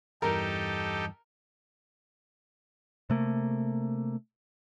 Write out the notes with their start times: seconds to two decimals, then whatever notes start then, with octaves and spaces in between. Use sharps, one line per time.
0.22 E2 G2 E3 D#4 G4 A4 A#4
3.10 C3 A3 A#3